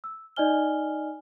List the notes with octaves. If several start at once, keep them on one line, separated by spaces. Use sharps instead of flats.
E6
D#4 D5 D#5 G#5 F6 G7